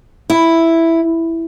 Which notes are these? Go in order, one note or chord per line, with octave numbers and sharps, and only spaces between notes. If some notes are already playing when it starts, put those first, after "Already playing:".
E4